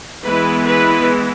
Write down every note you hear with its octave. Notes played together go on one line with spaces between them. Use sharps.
E3 G#3 B3 E4 B4
B4